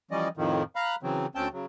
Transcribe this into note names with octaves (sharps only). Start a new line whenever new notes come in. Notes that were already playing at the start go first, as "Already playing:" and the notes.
E3 F3 G3 C#4 D5 D#5
F2 A2 D#3 F3
F5 A#5 B5 F#6
C#3 E3 F#3 C4
D2 C4 C#4 G5 A5 G6
C#3 F#3